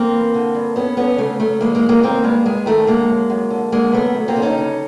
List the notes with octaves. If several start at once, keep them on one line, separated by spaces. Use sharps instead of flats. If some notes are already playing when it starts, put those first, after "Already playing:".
Already playing: A#3 C4
E3
D3
G2
G2 B3 C#4
D3 B3 C#4
C#3 A3
F#2 A3
E3 G#3 A#3
G#3 A#3
F#2
G#3 A#3
D#3 A#3 C4
G2 G#3 A#3
G2 G#3
D#3 A3
D3 G#3 A#3
F#2
F#2
D3
D3 G#3 A#3
F#2 A3 B3
F#2
A#3 C4
D3
C#4 D#4
C#3